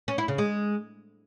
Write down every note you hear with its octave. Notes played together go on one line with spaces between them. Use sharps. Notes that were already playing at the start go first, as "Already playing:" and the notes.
C#4
E4
C#3
G#3